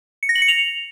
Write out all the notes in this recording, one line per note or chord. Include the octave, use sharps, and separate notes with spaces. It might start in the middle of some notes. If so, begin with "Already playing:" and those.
C#7
A#6
F#7
C#7
F7